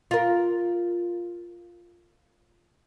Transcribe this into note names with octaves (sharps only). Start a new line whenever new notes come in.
F4 A#4